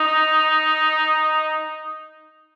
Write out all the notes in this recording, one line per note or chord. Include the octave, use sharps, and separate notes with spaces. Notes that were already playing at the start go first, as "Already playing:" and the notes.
Already playing: D#4